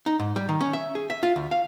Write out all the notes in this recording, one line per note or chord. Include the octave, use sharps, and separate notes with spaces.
D#4
G#2
G3
D#3
C#4
E5
G#4
E5
F4
D2
F5